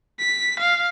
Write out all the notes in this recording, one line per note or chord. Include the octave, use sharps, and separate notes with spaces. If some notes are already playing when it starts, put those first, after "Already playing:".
B6
F5